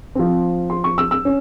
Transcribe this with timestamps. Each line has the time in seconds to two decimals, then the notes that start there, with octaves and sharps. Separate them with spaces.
0.15 F3 C4
0.70 C6
0.84 C#6
0.98 E6
1.11 E6
1.25 C#4